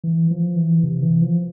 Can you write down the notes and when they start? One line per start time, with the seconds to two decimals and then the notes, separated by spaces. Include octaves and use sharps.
0.04 E3
0.31 F3
0.56 E3
0.83 C3
1.03 E3
1.22 F3